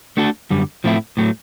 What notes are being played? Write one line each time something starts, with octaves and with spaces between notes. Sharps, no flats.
A3 D4 F#4 A4
F#2 D3 G3
A2 F3 A3 C4 E4
A2 F#3 A3